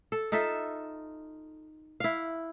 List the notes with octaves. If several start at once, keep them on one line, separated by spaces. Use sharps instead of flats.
A4
D#4 F4 A4 E5
E4 F5